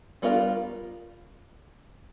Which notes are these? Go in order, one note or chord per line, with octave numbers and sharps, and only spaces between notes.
G3 B3 D4 F4 A#4